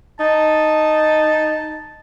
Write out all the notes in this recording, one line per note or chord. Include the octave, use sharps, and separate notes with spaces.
D#4 A5